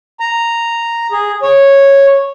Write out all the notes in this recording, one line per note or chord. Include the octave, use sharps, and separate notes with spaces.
A#5
G#4
C#5